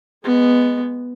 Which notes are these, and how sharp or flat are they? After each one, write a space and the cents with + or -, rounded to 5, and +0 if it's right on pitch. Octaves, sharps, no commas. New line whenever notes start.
G#3 -10 B3 +0